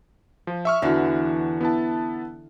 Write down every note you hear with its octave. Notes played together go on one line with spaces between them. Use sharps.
F3
E5 C#6 F6
E2 D3 E3 D4 F#4
B3 E4 A5